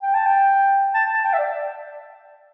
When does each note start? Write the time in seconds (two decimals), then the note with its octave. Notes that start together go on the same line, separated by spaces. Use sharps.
0.03 G5
0.14 A5
0.26 G5
0.94 A5
1.13 A5
1.24 G5
1.33 E5
1.38 D5